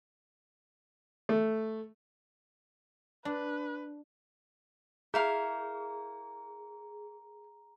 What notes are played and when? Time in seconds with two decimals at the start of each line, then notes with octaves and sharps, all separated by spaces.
1.29 A3
3.25 D4 B4
5.14 E4 G#4 A#4 F5 A#5